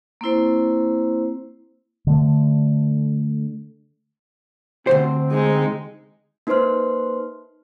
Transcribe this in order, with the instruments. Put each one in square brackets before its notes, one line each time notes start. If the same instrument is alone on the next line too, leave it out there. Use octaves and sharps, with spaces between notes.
[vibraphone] A#3 C4 E4 C5
[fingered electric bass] D3 A3
[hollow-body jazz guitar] D2 B2 C5 [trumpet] C4
[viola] G#3 D#4
[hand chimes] A#3 D#4 B4 C5 C6 F6